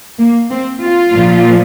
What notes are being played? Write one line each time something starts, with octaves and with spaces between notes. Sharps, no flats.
A#3
C4
F4
A#2 F3